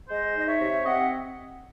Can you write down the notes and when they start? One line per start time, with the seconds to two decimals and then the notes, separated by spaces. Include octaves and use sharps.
0.09 G#3 C5 D#5
0.34 D#4 D#5
0.46 C#5 E5
0.59 C3
0.84 C4 D#5 F#5